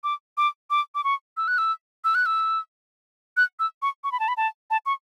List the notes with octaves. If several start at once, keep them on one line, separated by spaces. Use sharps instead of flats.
D6
D6
D6
D6
C#6
E6
F#6
E6
E6
F#6
E6
F#6
E6
C#6
C#6
B5
A5
B5
A5
A5
C#6